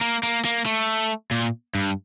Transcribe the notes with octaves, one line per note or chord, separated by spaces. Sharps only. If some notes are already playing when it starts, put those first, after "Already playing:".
A#3
A#3
A#3
A3
A#2
G2